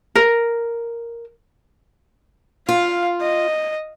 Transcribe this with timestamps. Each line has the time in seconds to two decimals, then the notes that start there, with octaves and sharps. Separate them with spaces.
0.15 A#4
2.69 F4 F5
3.21 D#5